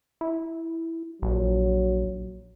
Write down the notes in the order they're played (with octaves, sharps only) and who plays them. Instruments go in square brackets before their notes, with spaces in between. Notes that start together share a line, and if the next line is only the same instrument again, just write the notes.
[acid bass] E4
[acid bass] A#1 [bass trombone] F#3